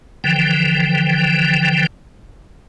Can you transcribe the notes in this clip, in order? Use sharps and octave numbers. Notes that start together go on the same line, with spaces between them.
D3 E3 F3 G5